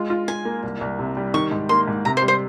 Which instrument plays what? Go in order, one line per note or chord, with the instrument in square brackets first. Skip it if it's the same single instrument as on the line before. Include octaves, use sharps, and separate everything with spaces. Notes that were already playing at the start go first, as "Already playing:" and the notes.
Already playing: [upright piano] G#3 F4
F4
[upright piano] F4 [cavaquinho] G#5
[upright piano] A#3
C2
C2
C3
G3
[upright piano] D#3 [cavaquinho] C#6
[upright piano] G#2
[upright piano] A#3 [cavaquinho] C6
[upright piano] G#2
[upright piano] C3 [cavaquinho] A#5
[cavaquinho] C5
[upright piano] G3
[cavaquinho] C5